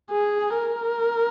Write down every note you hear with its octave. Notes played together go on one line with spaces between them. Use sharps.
G#4
A#4